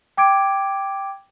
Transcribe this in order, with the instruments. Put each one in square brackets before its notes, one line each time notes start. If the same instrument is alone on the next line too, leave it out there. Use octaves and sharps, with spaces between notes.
[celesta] G5 D6 G#6 D7